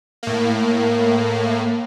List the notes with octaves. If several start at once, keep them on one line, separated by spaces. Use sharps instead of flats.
A2 A#3